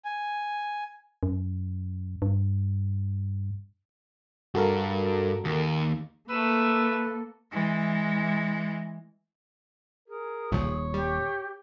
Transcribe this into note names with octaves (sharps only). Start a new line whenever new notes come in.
G#5
F#2
G2
G2 F#4 A4 A#4
D#2
A3 A#3 A4 B4 E6
E3 G#3
G#4 A#4
D#1 B1 A#2 F3 C#5
G3 G4